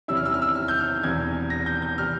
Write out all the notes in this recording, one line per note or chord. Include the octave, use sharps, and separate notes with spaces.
E2 C3 G3 C#4 E4 E6
F6
E6
F6
E6
F6
G6
F6
E1 E2 C3 E3 G#6
A#6
G6
G6
C3 E3 G3 F6